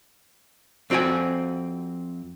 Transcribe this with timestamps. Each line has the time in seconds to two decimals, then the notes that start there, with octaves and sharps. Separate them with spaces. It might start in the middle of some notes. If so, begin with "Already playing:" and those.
0.90 F2 C4 F#4 D5 F#5 G#5